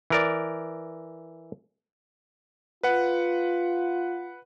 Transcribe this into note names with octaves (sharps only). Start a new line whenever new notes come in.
E3 A#4 D5
F4 B4 F#5